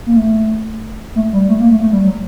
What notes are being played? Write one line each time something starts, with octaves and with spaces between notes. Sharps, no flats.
A#3
A3
A3
G3
A3
A#3
A3
A3
G3
F#3